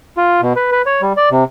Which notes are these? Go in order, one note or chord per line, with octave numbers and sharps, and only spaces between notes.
F4
B2
B4
B4
C#5
G3
D5
C3